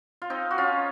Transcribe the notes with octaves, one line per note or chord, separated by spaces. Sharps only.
F4
C4 D#4
F#4
C#4 F4